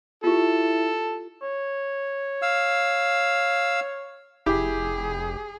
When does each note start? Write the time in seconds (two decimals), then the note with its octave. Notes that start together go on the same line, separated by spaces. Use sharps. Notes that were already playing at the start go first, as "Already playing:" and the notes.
0.24 E4 F4 G4 A4
1.42 C#5
2.42 F5 E6
4.46 F1 E4 G4 G#4